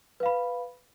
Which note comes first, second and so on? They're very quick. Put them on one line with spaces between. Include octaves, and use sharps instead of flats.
B4 F5 B5